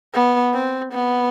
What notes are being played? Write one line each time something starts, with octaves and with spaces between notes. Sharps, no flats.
B3
C4
B3